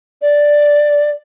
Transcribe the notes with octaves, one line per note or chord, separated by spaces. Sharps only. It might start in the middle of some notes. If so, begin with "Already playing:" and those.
D5